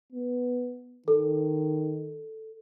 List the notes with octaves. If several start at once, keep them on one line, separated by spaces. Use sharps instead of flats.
B3
D#3 A4